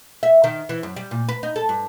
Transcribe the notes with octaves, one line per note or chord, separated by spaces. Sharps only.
E5
D#3
E3
F#2
G3
A#2
B4
D#4
A4
G2